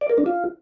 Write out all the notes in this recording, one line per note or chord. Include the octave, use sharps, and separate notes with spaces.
D5
A#4
D4
F4